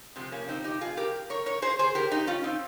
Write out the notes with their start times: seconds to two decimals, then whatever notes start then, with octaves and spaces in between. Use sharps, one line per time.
0.16 C3 F3 G#3 C4
0.32 A#3 C#4
0.49 C4 D#4
0.64 D#4 G4
0.81 F4 G#4
0.97 G4 A#4
1.30 A#4 C#5
1.46 A#4 C#5
1.62 G#4 C5
1.79 G#4 C5
1.95 G4 A#4
2.11 D#4 G4
2.27 C#4 F4
2.44 C4 D#4